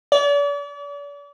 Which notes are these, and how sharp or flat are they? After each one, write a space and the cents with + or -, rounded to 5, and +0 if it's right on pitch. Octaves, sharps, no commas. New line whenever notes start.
D5 -40